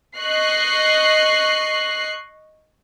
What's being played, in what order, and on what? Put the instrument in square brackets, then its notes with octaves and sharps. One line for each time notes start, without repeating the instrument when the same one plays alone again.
[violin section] D#5 C#6 F#6 C7